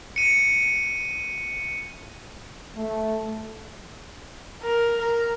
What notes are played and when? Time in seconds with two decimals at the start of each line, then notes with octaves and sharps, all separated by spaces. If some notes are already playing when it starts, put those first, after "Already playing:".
0.16 C#7 D#7
2.76 A3
4.63 A#4
5.01 A#4